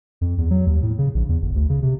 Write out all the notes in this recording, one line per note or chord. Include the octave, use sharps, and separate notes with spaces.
F2
E2
F#3
D#2
A2
C#3
A#1
E2
G1
D2
C#3
C3